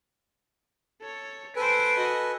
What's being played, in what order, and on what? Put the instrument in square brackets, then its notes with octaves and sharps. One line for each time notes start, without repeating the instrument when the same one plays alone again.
[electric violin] A4 C#5
[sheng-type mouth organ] A4 B4 G#5 [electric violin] C5 D7
[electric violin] F#4 D#5